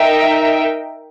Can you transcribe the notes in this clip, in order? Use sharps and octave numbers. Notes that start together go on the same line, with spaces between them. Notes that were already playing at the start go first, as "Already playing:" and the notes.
Already playing: D#4 A#4 E5 G5